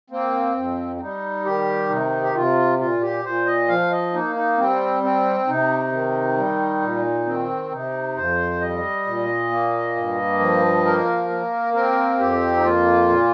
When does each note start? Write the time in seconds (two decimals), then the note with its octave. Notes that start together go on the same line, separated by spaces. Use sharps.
0.10 A#3 C4
0.56 F2
0.96 C4
1.01 G3 D#4
1.45 D#3 G4
1.89 C3 D#4
2.22 G4
2.35 C3 F4
2.79 A#2 F4
3.01 G4
3.25 A#2 C5
3.46 D#5
3.68 F3 F5
3.91 D#5
4.13 A#3 D#4
4.36 D#4
4.58 G3 C4
5.03 C4
5.47 C3 D#4
5.92 D#3
6.37 G3
6.81 A#2
7.26 D#3 C4
7.72 C3 D#4
8.16 F2 C5
8.61 G3 D#5
9.06 A#2
9.51 A#3
9.96 G2
10.39 F3
10.85 A#3 A#4
11.30 A#3
11.74 C4 A#4
12.19 F2 G4
12.57 D#4
12.63 A#3 F4
13.09 A#2